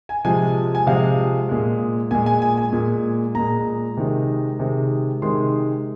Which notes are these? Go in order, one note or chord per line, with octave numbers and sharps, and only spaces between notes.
G#5
C3 F3 G#3 G#5
G#5
C3 F3 G#3 F5
A#2 G#3
A#2 G#3 G#5
G#5
G#5
G#5
A#2 G#3
A#2 G#3 A#5
C3 D#3 G#3
C3 D#3 G#3
C3 D#3 G#3 C6